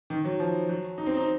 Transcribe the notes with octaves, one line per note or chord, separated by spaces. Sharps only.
D#3
F#3
F3
F#3
D#4
C4
D#4